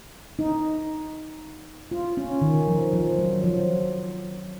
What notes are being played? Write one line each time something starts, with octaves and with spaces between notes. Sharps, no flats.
D#4
F4
C#4
D#3
F3
F3
F#3
F3